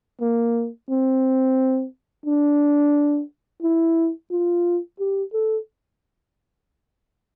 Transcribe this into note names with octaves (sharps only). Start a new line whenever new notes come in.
A#3
C4
D4
E4
F4
G4
A4